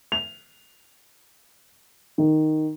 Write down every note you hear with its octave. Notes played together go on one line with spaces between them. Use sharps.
F7
D#3